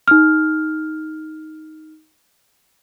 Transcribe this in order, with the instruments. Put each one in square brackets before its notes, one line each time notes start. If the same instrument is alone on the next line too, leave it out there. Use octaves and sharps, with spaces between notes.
[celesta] D#4 F6